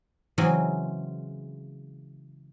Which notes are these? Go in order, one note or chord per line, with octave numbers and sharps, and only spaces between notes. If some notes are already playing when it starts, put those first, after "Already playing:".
C#3 E3 F#3 G#3 C4